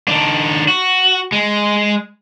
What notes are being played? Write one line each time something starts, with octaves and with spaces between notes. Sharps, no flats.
D#3 D4
F#4
G#3